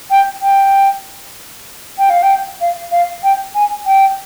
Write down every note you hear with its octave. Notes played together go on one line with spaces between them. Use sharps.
G5
G5
G5
F5
G5
F5
F5
G5
G#5
G5